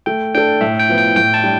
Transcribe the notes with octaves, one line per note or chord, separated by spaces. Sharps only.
A3 G5
D4 A4 G5
A2 E5
G5
F3 B3
G5
A2 G5
A5
G3 D4